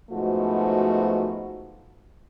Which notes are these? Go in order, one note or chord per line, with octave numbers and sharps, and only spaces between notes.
G#2 B2 F3 A3 F#4